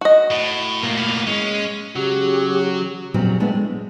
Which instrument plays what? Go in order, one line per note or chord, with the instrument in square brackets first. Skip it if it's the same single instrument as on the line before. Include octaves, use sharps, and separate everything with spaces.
[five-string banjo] F#4 D#5
[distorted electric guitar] A2
[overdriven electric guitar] A2 A#3 [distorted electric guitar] F4 A#4
[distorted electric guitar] B3 F5
[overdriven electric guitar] G#3 [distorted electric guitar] C#4
[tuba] C#3 [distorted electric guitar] F#3 [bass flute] G4
[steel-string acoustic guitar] F2 A#2 C#3 F#3 G3 C4
G#3 A3 B3 D4 E4
G#3